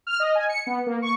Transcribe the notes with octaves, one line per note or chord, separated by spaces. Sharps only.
F6
D#5
G#5
C#7
B3
A#3
C#6